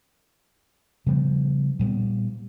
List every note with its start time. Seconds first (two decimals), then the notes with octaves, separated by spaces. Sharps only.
1.06 C#3 F3 G3 B3
1.79 A#2 G3 G#3 B3